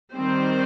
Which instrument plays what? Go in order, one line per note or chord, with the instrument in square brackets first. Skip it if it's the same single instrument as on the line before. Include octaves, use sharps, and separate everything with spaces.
[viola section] D#3 G3 C4 C5